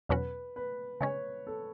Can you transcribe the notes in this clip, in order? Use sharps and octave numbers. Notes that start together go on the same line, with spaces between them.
E2 B2 F#3 C#4 F#4 B4
B4
C#3 G#3 C#4 C#5
A4